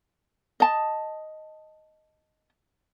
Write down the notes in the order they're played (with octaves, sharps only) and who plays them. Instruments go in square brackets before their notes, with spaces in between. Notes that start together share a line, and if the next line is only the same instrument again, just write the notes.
[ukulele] D#5 A5